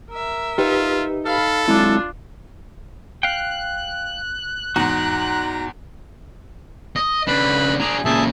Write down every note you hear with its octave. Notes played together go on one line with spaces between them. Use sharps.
A#4 E5
D#4 F4 G4 B4
A4 F5 B5
F#3 G#3 C4 D4 E4 F4
F5 G5 F#6
E2 G#2 D#4 F#4 A#5
D#5
C#3 D4 B4 B5
D4 G#4 A#5
A#2 C#3 G#4 E5 A5